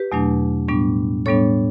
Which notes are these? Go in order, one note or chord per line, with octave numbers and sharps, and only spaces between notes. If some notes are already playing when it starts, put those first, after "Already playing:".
Already playing: G4 B4
E2 B2 F#3 A3 D4
A2 G3 B3 D4
A2 G3 B3 D4 A4 C#5